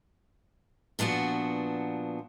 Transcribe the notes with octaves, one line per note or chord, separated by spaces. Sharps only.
A#2 F3 B3 D4 F#4